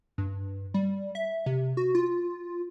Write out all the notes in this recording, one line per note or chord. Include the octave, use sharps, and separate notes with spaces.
G2
G3
E5
C3
F#4
F4